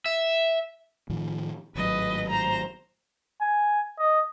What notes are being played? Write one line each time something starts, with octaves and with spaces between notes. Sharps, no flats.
E5
A2 D#3 F3
G#1 A2 F#3 B4 D#5
C5 A#5
G#5
D#5